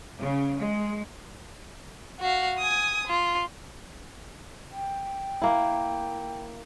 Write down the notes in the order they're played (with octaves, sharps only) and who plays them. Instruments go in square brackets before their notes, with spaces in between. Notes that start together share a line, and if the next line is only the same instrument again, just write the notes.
[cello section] C#3
G#3
[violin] F#4 F5
G#5 D#6
F4
[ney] G5
[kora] A#3 E4